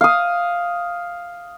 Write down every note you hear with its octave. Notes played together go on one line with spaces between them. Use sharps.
F5 D#6